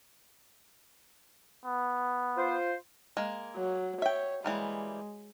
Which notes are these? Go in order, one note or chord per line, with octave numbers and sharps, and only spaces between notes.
B3
F4 C5
G#3 A#3
F#3
C#5 E5 G5
E3 G3 G#3 A#3